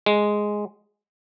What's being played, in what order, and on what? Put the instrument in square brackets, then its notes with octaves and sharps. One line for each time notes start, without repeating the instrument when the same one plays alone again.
[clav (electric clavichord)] G#3